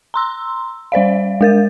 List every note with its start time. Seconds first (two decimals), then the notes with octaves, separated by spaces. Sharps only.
0.14 A#5 C6 E6
0.92 G3 C5 D5 F5
1.41 G#3 A#4 A6